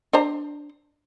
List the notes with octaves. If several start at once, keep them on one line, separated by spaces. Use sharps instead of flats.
D4 C5 A#5